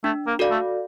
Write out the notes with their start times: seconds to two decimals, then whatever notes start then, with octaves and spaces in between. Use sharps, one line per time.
0.04 A3 D4
0.27 A#3
0.39 F#4 A4 D5 F5
0.51 A3